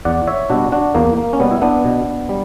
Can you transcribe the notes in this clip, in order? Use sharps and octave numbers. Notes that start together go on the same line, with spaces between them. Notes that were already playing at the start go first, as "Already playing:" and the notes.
E2 D5 F#5
C#5 E5
B2 G3 D4 F#4
D4 F#4
E2 A#3
A#3
C#4
B2 G3 B3
E4
B3 D4
B2
G3